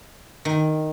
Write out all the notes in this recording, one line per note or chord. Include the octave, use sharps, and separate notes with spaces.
D#3